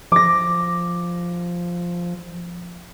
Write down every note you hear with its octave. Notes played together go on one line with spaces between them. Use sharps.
F3 D6 A#6